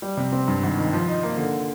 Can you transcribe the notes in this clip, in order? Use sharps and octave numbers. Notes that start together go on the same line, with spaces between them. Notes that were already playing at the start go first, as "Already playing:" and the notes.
G3
C3
C4
G2
G#1
D#3
F3
D#4
A#3
D3